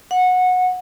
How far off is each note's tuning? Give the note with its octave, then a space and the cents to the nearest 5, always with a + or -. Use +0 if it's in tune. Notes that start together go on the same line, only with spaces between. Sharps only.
F#5 -15